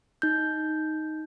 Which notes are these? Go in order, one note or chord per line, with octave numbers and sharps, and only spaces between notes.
D#4 G6